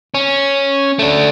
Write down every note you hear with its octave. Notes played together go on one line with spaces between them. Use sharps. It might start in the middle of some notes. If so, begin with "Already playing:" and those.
C#4
A3 D4